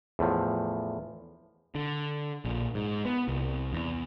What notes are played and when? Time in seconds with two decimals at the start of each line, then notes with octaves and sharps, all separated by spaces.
0.19 E2 A2 F3
1.75 D3
2.45 A#1
2.75 G#2
3.05 B3
3.28 C2
3.73 E2